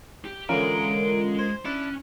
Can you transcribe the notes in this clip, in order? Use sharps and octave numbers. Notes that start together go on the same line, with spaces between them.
G4
D3 E3 G#3 C#4 F4 A#4 G#5 D7
C5 G#6
C#4 D4 E4 A5 F#6